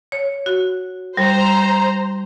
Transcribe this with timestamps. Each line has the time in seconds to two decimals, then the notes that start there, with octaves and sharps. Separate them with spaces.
0.12 C#5
0.46 F#4
1.17 G3 C5 A#5